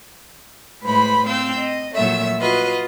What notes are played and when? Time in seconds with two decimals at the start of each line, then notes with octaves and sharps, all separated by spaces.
0.83 A2 G#3 B4 C5 B5
1.27 C4 F5 E6 G6
1.59 D#5
1.95 F2 A#2 F#3 A3 E5 E6
2.40 F4 F#4 B4 D#5